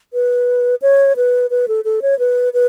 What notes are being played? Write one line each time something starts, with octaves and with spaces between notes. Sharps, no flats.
B4
C#5
B4
B4
A4
A4
C#5
B4
B4